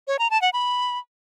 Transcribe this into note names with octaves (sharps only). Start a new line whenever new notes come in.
C#5
A#5
A5
F#5
B5